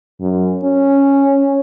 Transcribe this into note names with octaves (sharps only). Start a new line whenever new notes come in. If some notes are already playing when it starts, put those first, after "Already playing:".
F#2
C#4